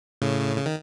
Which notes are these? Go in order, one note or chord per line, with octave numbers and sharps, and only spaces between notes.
A2 C#3
C#3
D#3